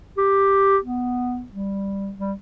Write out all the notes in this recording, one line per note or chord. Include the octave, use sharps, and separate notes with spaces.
G4
B3
G3
G3